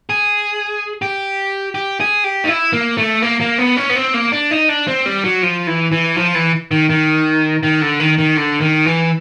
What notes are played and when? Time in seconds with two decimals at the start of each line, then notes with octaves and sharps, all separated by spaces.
0.10 G#4
1.02 G4
1.75 G4
2.00 G#4
2.24 G4
2.44 D#4
2.48 E4
2.73 A#3
2.97 A3
3.22 A#3
3.40 A#3
3.58 B3
3.77 C#4
3.89 B3
3.96 C4
4.14 A#3
4.32 D4
4.51 D#4
4.69 D4
4.87 C4
5.06 G3
5.24 F#3
5.43 F3
5.67 E3
5.92 E3
6.16 F3
6.35 E3
6.71 D#3
6.90 D#3
7.63 D#3
7.82 D3
8.00 D#3
8.18 D#3
8.37 D3
8.61 D#3
8.86 E3